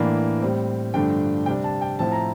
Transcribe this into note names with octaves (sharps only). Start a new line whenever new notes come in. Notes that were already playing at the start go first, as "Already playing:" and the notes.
Already playing: A2 E3 A#3 D4
A2 G3 C4
G2 D3 F3 A3 D4 G5
C3 G3 D4 G5
A5
G5
A2 F3 C4 E4 A5
A#5